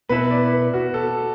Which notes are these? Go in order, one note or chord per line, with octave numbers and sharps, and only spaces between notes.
B2 B3 E4 B4
D5
B4
F#4
A4